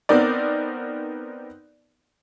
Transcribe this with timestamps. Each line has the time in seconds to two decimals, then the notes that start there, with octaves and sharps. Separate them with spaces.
0.09 B3 C4 D#4 A#4 D5